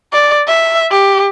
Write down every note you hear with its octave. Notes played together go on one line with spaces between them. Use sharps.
D5
E5
G4